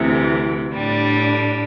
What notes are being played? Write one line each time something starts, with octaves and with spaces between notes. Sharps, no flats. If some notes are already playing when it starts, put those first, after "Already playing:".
Already playing: D2 C3 E3
A2 G3 D4